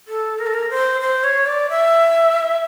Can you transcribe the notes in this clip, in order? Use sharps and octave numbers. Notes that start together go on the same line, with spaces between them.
A4
A#4
A4
A#4
C5
C5
C#5
D5
E5